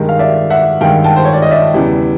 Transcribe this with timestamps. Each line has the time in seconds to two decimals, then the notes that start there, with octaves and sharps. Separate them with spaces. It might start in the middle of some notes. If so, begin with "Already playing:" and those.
Already playing: G2 D#3 G#3 A#4
0.09 F5
0.19 D5 E5
0.50 E5 F#5
0.81 G2 D#3 G#3 F5 G5
1.04 G5 A5
1.16 C5
1.25 C#5
1.33 D5
1.42 D#5
1.51 D5 E5
1.74 E2 C#3 E3 G3